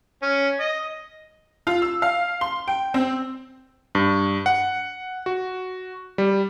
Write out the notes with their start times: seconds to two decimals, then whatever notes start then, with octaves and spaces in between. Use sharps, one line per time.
0.22 C#4
0.60 D#5
1.67 F4
1.82 E6
2.02 F5
2.41 C6
2.68 G5
2.94 C4
3.95 G2
4.46 F#5
5.26 F#4
6.18 G3